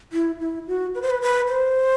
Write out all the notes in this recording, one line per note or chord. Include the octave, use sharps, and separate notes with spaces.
E4
E4
F#4
B4
C5
B4
B4
C5